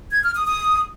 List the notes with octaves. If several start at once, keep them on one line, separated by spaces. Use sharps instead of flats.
G#6
F6
D#6
D#6